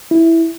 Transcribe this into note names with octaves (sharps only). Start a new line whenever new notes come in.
E4